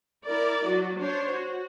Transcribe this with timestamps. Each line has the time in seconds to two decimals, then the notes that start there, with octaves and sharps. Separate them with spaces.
0.24 E4 A#4 D5
0.65 F#3 F#4
0.98 D4 C5 C#5
1.32 F#4